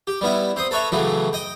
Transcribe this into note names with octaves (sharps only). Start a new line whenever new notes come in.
G4
G3 B3 E4
C4 C5 D#6
A4 B4 C#5 E5 A#5
A2 C#3 E3 F#3 A3
D#5 G5